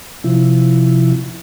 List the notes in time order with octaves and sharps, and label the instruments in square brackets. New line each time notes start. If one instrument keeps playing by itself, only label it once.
[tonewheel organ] C3 F3 E4